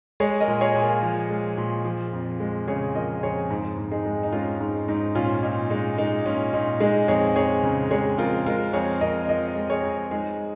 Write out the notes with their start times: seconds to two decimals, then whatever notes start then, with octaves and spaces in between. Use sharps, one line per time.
0.20 G#3 G#4 C#5
0.40 A#4 D#5
0.48 A#2
0.61 G#4 C#5
0.75 A#2
0.82 F4 A#4
1.03 F3
1.30 G#3
1.57 A#2
1.85 F3
2.13 F2
2.40 G#3
2.68 C#3 G#4 C#5
2.95 F3 A#4 D#5
3.23 F2 G#4 C#5
3.50 G#2
3.78 G#2
3.91 D#4 G#4
4.06 G#3
4.23 D#4
4.32 G#3 C#4 F4
4.61 G#2
4.88 G#2 D#4
5.15 A#2 C#4 F4
5.43 A#2 D#4
5.70 G#3 D#4
5.98 G#3 D#4
6.26 A#2 C#4
6.53 A#2 D#4
6.80 G#3 D#4 G#4
7.08 F2 G#4 C#5
7.36 F2 G#4 C#5
7.63 C#3
7.91 G#3 G#4 C#5
8.18 F2 F4 A#4
8.46 G#3 F4 A#4
8.73 F2 G#4 C#5
9.01 F2 A#4 D#5
9.28 F3 A#4 D#5
9.56 G#3
9.70 G#4 C#5
9.83 F2
10.11 G#3 D#4 G#4